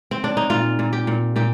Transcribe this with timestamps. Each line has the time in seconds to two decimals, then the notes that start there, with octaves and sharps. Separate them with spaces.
0.11 C4
0.24 D4
0.37 D#4
0.50 A#2 F4
0.79 A#2
0.93 G4
1.07 A#2
1.36 A#2 G4